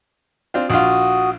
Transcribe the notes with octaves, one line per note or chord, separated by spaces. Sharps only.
C4 D4 F4
A#1 F4 F#4 D#6